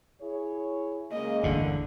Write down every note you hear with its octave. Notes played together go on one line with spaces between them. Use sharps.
E4 G#4 C#5
C#3 G#3 A#3 D#5
G1 E2 A2 D3